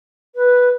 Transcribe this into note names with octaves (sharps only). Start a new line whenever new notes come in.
B4